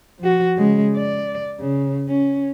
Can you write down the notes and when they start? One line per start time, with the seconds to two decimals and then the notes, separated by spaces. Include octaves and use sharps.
0.19 F3 F#4
0.58 C#3 G#3
0.97 D5
1.60 C#3
2.09 C#4